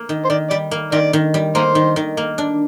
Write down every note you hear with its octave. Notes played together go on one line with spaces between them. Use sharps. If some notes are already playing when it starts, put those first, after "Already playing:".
Already playing: A#3
D#3
C5
D#3 D5
G3 D5
A#3
D#3 A#4 D5
D#3
G3
A#3 D#4 C5
D#3
D#3
A#3
D4